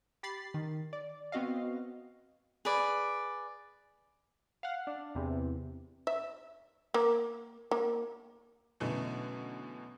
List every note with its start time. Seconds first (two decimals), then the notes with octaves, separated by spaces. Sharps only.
0.23 G4 B5 A6 C7
0.54 D#3
0.93 D5
1.32 B3 C4 F#4 D#5 F5
2.65 G#4 B4 D5
4.63 F5 F#5
4.87 D4
5.15 E2 C3
6.07 E5
6.94 A#3
7.71 A#3
8.80 F#2 B2 D3 E3 F#3 A3